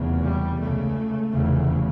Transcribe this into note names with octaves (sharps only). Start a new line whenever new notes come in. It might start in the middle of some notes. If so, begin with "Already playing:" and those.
Already playing: F1 E2 C#3
G3
C#2 C#3 A3
F1 E2 C#3